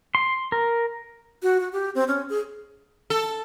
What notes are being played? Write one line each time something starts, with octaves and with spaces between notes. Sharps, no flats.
C6
A#4
F#4
F#4
G4
C4
C#4
G#4
A4